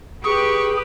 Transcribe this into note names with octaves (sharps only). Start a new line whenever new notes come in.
G4 G#4 B4 C#6